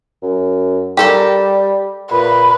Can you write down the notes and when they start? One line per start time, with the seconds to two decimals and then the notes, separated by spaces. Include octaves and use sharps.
0.23 F#2
0.97 G3 G4 A4 A#4
2.11 A#2 B4